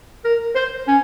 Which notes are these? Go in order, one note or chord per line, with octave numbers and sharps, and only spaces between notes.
A#4
C5
C#4